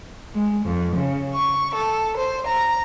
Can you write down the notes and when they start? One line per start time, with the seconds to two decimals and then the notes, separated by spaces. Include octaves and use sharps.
0.34 G#3
0.65 F2
0.96 C#3
1.34 C#6
1.74 A4
2.16 C5
2.46 A#5